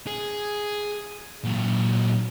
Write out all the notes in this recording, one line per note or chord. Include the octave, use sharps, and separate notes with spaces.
G#4
A#2 F#3